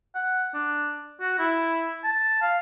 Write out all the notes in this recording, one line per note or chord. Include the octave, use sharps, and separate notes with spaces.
F#5
D4
F#4
E4
A5
F5